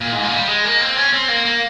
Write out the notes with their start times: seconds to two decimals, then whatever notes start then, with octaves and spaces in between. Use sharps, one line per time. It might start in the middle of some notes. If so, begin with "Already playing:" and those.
0.01 A#2
0.12 G#2
0.23 A#2
0.33 G3
0.48 G#3
0.65 A#3
0.81 C4
0.97 C#4
1.13 C4
1.28 A#3
1.45 A#3